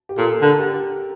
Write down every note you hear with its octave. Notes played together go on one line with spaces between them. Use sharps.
G4
A#2 A4
D3 A#4
G4